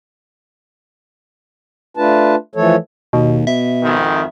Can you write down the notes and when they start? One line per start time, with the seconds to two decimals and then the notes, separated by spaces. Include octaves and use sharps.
1.97 A3 D4 F4 B4 A5
2.55 E3 F3 A3 A4 C#5
3.13 D#2 B2
3.47 B2 E5
3.83 G#1 F2 D#3